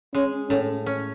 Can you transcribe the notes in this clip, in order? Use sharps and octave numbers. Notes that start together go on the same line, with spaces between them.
G#3 C#4
A2 C#4
C#4